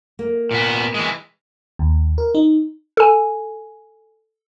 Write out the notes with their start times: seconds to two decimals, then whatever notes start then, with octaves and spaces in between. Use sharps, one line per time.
0.19 A#3
0.51 A#2 B3
0.94 E3 G#3
1.79 D#2
2.18 A#4
2.35 D#4
2.97 A4 G#5